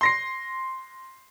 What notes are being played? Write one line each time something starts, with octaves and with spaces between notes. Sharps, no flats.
C6 A#6 C7